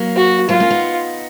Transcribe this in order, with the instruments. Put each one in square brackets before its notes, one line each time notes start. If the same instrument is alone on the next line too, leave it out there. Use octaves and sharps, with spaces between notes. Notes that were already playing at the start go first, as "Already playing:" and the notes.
Already playing: [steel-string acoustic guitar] F#3 A#3
[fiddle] F#4
[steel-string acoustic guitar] F#3 A#3 [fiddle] F4
[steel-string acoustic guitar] A#3 C#4
B3 D#4